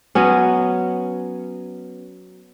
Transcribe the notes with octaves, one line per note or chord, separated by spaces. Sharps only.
F#3 B3 C#4